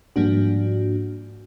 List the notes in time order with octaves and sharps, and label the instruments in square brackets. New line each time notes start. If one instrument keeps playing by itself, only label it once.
[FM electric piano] G#2 F3 G3 A#3 D4 F#4